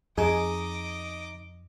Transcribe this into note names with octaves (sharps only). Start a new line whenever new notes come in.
F2 D#4 G#4 D#5 D6